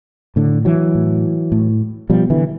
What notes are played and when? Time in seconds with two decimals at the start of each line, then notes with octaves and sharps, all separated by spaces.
0.36 A2 D3
0.65 E3 F#3
0.95 A2
1.52 A2
2.10 B2 F3 G3
2.30 D3 E3